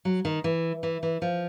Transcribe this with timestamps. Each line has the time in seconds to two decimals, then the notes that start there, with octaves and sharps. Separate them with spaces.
0.05 F#3
0.25 D#3
0.44 E3
0.83 E3
1.03 E3
1.22 F3